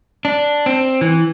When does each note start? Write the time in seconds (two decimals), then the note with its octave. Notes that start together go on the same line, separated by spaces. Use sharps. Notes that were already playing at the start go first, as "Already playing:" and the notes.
0.25 D4
0.66 C4
1.01 E3